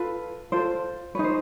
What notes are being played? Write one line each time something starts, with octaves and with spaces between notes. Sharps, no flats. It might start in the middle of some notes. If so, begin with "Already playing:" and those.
Already playing: F4 A4 B4
F4 A4 C5
D#4 G#4 B4 C#5
C5